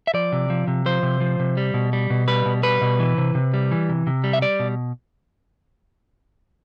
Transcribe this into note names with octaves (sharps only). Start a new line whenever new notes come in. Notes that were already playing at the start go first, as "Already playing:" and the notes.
E5
F3 D5
C3
F3
C3
F3 C5
C3
F3
C3
G3
B2
G3
B2
G3 B4
B2
G3 B4
B2
E3
C3
C3
G3
E3
C3
C3
G3
E5
G3 D5
B2